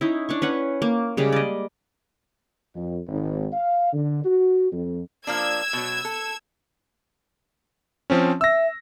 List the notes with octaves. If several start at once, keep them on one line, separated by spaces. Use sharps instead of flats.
C#4 D#4 E4
D4 C#5 C#6
C#4 B4 F#5
A#3
C#3 G3 G#3 G#4
D5 D#5
F2
G#1
F5
D3
F#4
F2
F3 A#3 D4 E6 G#6
B2 F#3
A4
F3 C4 C#4
E5 E6 A#6